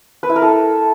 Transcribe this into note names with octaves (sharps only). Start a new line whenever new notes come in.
B4
E4
A#4
A4